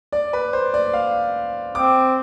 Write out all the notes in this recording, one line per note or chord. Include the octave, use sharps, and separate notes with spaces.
D5
B4
C5
D5
F5
C4 D6